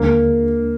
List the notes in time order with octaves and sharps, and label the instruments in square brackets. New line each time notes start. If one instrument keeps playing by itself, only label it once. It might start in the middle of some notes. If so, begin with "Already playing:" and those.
Already playing: [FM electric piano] D#2 D3 G#3 D4 [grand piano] A#3